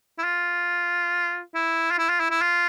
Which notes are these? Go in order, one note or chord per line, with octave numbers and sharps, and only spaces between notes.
E4
F4
E4
F4
E4
F4
E4
E4
F4